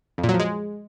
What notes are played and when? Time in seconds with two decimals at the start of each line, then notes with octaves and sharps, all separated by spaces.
0.18 F2
0.23 A#2
0.29 F#3
0.34 F3
0.40 G#3